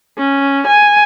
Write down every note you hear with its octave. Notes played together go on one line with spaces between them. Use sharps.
C#4
G#5